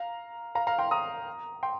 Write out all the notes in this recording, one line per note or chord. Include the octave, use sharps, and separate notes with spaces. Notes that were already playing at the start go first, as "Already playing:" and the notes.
Already playing: F5 A#5
F5 A#5
F5 A#5
G5 C6
A#5 D#6
G5 C6